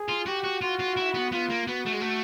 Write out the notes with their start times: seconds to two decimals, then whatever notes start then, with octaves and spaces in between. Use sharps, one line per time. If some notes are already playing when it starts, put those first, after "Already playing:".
Already playing: G#4
0.09 F4
0.26 F#4 G4
0.44 F#4
0.62 F4 F#4
0.79 F4
0.97 E4
1.14 B3
1.32 B3 F4
1.50 A#3
1.67 B3 F#4
1.85 A3
1.92 G#3
2.01 A3